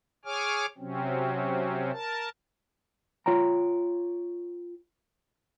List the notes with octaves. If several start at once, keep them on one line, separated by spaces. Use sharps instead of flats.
G#4 C#5 G#5 D6 F6
C3 F#3 C4 C#4
A#4 A5
F4 C#5 G5 A#5